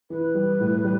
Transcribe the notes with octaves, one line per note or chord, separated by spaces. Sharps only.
E3 B4
G3
A2
G3